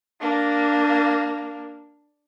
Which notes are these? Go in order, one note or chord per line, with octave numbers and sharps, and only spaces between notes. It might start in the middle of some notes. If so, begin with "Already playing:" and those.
A#3 D4